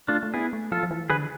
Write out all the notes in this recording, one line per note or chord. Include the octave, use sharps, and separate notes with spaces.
A3 D4 F4
A3
B3 E4 G#4
A3
F3 F4 A4
F3
E3
D3 G#4 B4